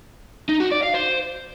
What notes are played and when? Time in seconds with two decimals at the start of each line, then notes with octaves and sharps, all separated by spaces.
0.49 D#4
0.60 F#4
0.71 D5
0.82 F5
0.94 C5